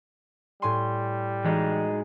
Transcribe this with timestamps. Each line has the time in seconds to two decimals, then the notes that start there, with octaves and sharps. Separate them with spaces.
0.62 A2 G3 G#5 C6
1.45 E3 F#3 G#3 D#4